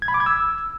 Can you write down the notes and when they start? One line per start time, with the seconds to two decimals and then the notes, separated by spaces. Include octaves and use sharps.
0.02 G#6
0.08 B5
0.14 D6
0.20 G#6
0.26 E6